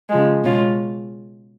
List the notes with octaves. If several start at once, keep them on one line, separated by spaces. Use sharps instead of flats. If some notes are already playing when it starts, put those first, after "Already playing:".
C#3 F3 G#3
B2 G#3 C#4 F4